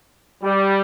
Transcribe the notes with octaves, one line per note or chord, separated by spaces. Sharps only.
G3